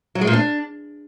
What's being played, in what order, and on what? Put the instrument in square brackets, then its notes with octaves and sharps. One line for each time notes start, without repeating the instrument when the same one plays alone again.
[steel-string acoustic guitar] F#3
G#3
A#2
D4